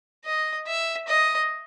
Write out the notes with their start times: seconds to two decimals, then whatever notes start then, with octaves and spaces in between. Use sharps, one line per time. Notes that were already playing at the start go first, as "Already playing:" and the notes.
0.25 D#5
0.67 E5
1.08 D#5